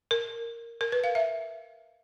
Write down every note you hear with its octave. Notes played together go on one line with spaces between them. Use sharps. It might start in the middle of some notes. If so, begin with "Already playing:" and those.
A#4
A#4
B4
F5
E5